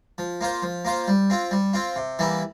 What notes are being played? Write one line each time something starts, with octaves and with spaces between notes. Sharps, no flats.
F3
A#3 F4 C5
F3
A#3 F4 C5
G3
C4 F4
G3
C4 F4
C3
E3 G3 A#3 E4